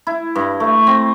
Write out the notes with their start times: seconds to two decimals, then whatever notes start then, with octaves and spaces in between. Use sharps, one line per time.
0.07 E4
0.35 G2
0.60 A3
0.87 C4